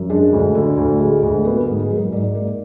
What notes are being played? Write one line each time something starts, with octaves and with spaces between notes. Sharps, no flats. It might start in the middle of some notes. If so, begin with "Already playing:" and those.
Already playing: F#2
G#3 D4
D2
D3
D2
G#3
D2
A#3 B3
G#2
G#4
F#3
A#4
G#2 D5
A#3